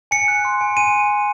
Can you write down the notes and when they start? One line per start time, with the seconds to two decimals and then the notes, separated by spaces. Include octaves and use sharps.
0.11 G#5 C#7
0.28 F#6
0.45 C6
0.61 G#5
0.77 G#5 D#7